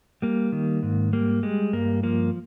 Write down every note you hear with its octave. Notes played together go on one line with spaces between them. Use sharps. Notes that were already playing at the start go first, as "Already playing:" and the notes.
G3 A#3
D#3
G#2
G3 A#3
G3 G#3
G2 A#3
F3 A#3